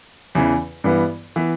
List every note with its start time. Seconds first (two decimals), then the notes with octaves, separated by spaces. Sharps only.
0.35 E2 C#3 E3
0.84 G2 E3 B3
1.36 E3 B3